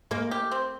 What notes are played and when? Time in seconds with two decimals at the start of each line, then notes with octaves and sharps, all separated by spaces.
0.11 G#3 A#3
0.31 G4
0.51 C4